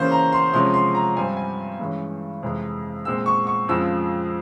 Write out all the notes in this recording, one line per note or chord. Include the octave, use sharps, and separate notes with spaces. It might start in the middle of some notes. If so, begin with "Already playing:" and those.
Already playing: C#3 E3 A#3 C#4 C5
A#5
C6
C3 F3 G#3 C#4 C6
C6
A#5
G2 G3 C4 G#5
G#5
G2 E3 G#3 C#4
F2 C3 E3 G#3
A#2 G#3 C4 E6
C#6
C#6
F2 C#3 F3 G#3 E6